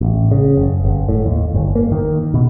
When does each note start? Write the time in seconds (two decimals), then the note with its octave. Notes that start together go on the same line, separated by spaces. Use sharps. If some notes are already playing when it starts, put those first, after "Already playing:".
0.01 A1
0.31 C#3
0.57 F#1
0.85 G1
1.09 A2
1.26 D#2
1.54 G1
1.75 A#3
1.92 D#3
2.34 B2